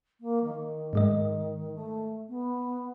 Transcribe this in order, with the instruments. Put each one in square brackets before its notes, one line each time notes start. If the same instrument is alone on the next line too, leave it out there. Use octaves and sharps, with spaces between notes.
[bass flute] A#3
D#3
[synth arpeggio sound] G#2 G#3 D#5
[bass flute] A3
B3